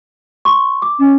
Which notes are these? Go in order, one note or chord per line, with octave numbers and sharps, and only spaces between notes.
C6 C#6
D6
C#4